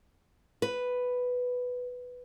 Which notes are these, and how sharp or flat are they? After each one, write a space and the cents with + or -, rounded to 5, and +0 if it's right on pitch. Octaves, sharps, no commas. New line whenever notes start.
B4 +5